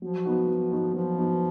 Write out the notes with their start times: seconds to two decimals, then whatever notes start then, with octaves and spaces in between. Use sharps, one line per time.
0.02 F3 F#3
0.25 B3 D#4 F#4
0.48 F#3
0.72 B3 D#4 F#4
0.94 F3 F#3
1.18 B3 D#4 F#4